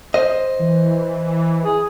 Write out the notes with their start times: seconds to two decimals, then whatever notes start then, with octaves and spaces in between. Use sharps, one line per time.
0.14 C5 D#5
0.59 E3
1.65 G#4